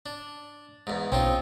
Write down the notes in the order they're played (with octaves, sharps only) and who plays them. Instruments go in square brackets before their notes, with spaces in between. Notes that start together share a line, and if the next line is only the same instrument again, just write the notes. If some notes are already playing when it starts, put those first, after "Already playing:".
[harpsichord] D4
E2 G#2
[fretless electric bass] B1 [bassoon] C4 [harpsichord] C#4 D#4 F4